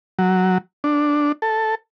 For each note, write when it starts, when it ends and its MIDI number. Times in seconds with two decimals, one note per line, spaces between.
0.19 0.58 54
0.84 1.32 62
1.42 1.75 69